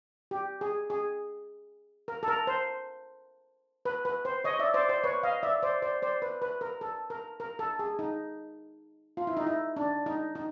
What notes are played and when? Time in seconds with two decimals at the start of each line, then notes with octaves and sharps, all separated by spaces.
0.31 G4
0.61 G#4
0.90 G#4
2.08 A#4
2.23 A4
2.28 A#4
2.47 C5
3.85 B4
4.05 B4
4.25 C5
4.44 C#5 D#5
4.59 D5 E5
4.74 C5 D5
4.89 C5 D5
5.04 B4 C#5
5.23 D#5 F5
5.43 D5 E5
5.63 C5 D5
5.82 C5 D5
6.02 C5 D5
6.22 B4
6.42 B4
6.61 A#4
6.81 A4
7.10 A#4
7.40 A#4
7.59 A4
7.79 G#4
7.99 D#4
9.17 F4
9.27 E4
9.37 D#4
9.47 E4
9.76 D4
10.06 D#4
10.35 D#4